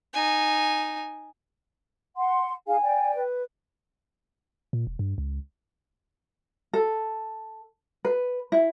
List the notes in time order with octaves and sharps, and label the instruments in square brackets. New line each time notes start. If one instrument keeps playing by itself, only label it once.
[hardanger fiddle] D#4 G#5
[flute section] F#5 C6
[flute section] D#4 G#4 F5 [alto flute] G#5
[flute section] D5 G5
[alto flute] B4
[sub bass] A#2
E1
G2
C#2
[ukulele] A4
B4
E4